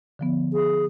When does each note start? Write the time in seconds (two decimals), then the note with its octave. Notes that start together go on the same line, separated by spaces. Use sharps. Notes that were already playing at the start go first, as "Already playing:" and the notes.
0.19 D3 F3 B3
0.53 G#4